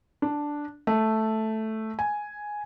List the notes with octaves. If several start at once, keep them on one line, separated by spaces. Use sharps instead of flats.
D4
A3
G#5